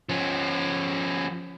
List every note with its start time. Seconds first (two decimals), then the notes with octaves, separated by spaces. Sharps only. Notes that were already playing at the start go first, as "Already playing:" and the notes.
0.09 F3 C#4